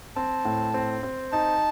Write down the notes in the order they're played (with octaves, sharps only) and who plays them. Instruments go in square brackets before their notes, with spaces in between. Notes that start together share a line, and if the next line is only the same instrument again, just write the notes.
[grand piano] C4 [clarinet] A5
[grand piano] A2
C4
C4
[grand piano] D#4 [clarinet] A5